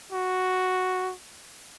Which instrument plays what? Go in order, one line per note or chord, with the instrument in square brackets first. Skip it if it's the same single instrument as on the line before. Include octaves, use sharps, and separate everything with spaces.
[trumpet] F#4